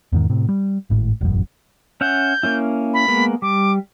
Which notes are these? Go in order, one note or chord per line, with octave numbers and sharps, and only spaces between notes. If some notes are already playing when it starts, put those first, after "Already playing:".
E2 G#2 D#3
A2 C3
G3
G#1 A2
E1 A1 F#2
C#4 E5 F#5 G6
A#3 C#4 E4
B5
G#3 A#3 B3
G3 D6